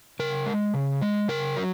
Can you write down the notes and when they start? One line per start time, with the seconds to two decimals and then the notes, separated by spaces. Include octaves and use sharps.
0.19 C#3 A#4
0.46 G#3
0.74 C#3
1.02 G#3
1.28 C#3 A#4
1.57 F#3